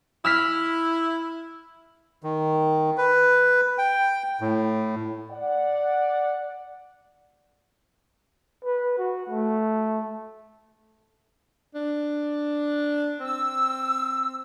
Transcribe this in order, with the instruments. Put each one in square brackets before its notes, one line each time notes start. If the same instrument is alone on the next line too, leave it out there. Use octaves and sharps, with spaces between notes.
[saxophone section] E4 [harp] E6 F6 B6
[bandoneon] D#3
B4
G5
A2
[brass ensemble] D5 F#5
[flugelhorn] B4
F#4
A3
[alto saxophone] D4
[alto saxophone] C4 [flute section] E6